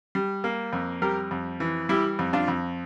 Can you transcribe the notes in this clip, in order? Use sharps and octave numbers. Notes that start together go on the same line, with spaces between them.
G3
A#3
F2
G3 G4 A#4
F2
E3
G3 E4 G4
F2
D4 F4
F2